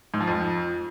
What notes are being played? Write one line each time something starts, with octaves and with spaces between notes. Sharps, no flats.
G#2
F3
F2